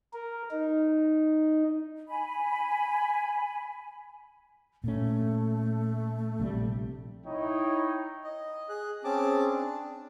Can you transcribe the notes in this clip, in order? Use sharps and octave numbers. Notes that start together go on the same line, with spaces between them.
A#4
D#4
G#5 B5
A#2 A3 C#4
A#1 C3 G3
D#4 E4 C#5 D#5 G5
D#5
G#4 F#6
C4 C#4 G#4 A5 D6
D4